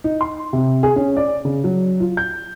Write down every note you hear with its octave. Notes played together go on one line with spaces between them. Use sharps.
D#4
C6
C3
G#4
C#4
D5
C#3
F#3
F4
G6